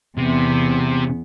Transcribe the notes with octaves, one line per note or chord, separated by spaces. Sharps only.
E2 C3 B3